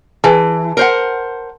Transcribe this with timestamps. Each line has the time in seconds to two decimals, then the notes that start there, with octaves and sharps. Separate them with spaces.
0.24 E3 G#4 B4 A5
0.77 A#4 C5 F#5